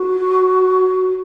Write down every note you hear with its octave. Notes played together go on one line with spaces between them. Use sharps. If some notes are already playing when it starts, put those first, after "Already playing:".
Already playing: F#4